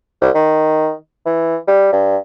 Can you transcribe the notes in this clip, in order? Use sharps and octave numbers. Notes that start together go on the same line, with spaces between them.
C2
D#3
E3
G3
G2